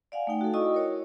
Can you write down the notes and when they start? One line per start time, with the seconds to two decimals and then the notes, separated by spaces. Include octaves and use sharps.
0.12 D5 F5 F#5 G#5
0.27 A3 D#4 G5
0.41 F#4 A4
0.54 E4 F#4 D#5 C#6 D#6
0.74 A#4 C#5